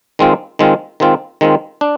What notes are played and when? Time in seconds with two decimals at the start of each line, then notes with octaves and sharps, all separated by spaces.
0.19 D#3 G#3 C4 F4
0.59 D#3 G#3 C4 F4
1.00 D#3 G#3 C4 F4
1.41 D#3 G#3 C4 F4
1.81 D4